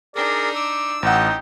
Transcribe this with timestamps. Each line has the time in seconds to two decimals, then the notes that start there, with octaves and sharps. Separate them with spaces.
0.16 D4 D#4 G#4 A#4 D5
0.55 D6 E6
1.03 A1 D#4 G4 F#5